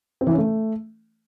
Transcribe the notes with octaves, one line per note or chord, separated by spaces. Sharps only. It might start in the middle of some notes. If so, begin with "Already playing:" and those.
C4
E3
C#4
A3